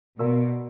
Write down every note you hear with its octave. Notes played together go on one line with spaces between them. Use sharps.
B2 F#4 A#4 D5 F5 A#5